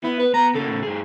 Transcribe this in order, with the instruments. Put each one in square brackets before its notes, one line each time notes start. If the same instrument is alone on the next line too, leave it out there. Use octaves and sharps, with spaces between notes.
[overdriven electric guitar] B3 [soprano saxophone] E4
[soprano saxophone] B4
[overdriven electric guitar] B3 [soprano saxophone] A#5
[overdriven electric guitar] C#3 A#3 [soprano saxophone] A4
[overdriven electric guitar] A2 C#3
G2 G#4